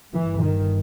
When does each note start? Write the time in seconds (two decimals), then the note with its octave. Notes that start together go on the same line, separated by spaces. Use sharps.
0.14 G1 G2 E3
0.42 D#3